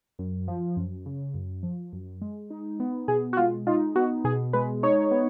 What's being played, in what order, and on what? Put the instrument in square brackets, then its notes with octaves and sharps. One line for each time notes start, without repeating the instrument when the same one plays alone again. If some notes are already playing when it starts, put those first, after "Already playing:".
[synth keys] F#2
F3
F#2
C#3
F#2
F3
F#2
G#3
D#4
B3
B2 G#4
F#4
G#3 F4
D#4 F4
B3 F#4
B2 G#4
G#3 B4
D#4 C#5
B3